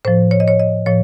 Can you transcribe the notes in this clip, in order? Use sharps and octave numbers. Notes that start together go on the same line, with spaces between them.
A2 F3 C5
C#5
D#5
C#5
D#5
A2 F3 C#5